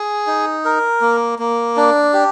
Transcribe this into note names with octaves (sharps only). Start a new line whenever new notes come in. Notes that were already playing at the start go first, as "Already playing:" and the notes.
Already playing: G#4
D#4
A#4
A#3
A#3
D4
G4